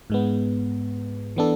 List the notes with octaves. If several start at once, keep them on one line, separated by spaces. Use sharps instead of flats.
G#2 G#3 B3
E3 B3 D4 A4